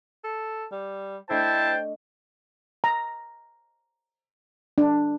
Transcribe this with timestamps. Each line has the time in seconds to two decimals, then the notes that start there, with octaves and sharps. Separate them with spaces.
0.24 A4
0.72 G3
1.30 A3 D4 E4 C5 D#5 G5 A5
2.84 A#5
4.78 D4